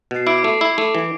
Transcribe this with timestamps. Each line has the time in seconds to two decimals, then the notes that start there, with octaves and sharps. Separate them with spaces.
0.11 B2
0.16 C7
0.27 E4 D6 D7
0.38 D6 D7
0.44 A3
0.50 C7
0.61 E4
0.78 A3
0.95 E3